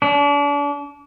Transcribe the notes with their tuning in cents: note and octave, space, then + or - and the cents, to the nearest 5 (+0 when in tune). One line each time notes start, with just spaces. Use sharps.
D4 -35